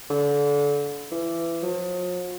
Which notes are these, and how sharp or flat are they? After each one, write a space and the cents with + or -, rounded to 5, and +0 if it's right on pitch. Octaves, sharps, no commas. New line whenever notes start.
D3 -30
E3 +25
F3 +45